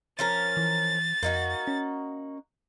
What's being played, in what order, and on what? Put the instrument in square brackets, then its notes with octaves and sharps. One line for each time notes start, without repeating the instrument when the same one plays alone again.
[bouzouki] F3 C#4 A#4 [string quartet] A6
[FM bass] E3
[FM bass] F2 [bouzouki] A#3 D#4 F#4
[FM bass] C#4